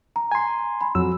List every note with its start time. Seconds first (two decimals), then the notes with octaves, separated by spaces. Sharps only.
0.16 A#5
0.32 G#5 C6
0.81 B5
0.95 F2 F#3 E6